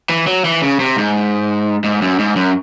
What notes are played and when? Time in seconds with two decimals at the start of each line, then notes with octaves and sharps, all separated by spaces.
0.09 E3
0.27 F#3
0.45 E3
0.62 C#3
0.80 C3
0.97 G#2
1.84 G#2
2.02 F#2
2.19 G#2
2.36 F#2